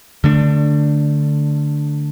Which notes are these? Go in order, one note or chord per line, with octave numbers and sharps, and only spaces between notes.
D3 A3 D4